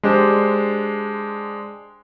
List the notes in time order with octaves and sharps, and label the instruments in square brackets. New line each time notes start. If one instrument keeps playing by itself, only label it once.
[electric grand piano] G#3 D4 G4 C5